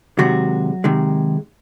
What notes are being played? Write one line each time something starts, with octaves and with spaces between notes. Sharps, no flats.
C3 D#3 F#3 G#3 F#4
C3 D#3 G#3